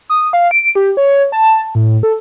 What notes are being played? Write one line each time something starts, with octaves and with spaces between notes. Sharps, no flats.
D#6
F5
D7
G4
C#5
A5
A2
A4